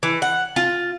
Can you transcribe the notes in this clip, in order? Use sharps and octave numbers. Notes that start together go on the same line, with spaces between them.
E3
F#5
F4